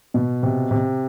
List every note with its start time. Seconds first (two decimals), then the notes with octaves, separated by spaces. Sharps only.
0.14 B2
0.43 C3
0.71 C3